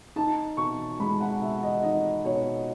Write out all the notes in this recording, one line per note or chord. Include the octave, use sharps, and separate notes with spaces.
D#4 A5
B2 C#6
G#3 B5
F#5
B2 E5
D#5
D#4 D#5
B2 C#5